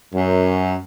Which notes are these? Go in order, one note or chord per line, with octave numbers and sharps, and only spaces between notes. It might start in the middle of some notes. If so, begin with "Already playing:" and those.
F#2